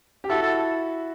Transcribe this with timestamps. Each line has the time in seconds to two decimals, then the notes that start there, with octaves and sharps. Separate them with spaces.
0.24 G4
0.30 E4 F#4 A4
0.42 A4